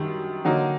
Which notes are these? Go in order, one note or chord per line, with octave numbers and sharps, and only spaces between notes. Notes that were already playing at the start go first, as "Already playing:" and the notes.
Already playing: F#2 D#3 G3
D3 F#3 A#3 D#4